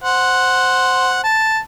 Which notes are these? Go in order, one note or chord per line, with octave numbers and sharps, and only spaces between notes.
C5 F#5
A5